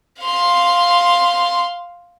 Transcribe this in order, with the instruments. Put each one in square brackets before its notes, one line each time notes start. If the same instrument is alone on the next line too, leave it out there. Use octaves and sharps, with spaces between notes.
[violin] F5 C6